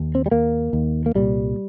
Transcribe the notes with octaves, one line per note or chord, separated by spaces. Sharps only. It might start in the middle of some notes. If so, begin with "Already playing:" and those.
Already playing: D#2
C4
G3
D#2 A#3
D#2
A#3
C2 A#2 G3